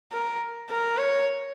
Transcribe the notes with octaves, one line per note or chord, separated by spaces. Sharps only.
A#4
A#4
C#5